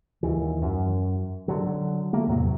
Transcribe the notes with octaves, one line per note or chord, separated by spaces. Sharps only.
D#2 E3
F#2
D3 F#3
A3 A#3
E2 A2 C3 F#3